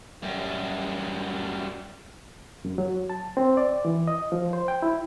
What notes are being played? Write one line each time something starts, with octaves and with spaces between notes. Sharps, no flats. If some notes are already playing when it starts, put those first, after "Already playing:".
F#2 G3
F#2
F#3
A5
C4
D5
E3
D#5
F3
C5
G5
E4